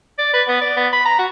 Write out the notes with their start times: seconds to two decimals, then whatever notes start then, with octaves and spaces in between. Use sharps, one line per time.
0.18 D5
0.34 B4
0.47 B3
0.61 D5
0.77 B3
0.93 B5
1.05 A#5
1.19 F#4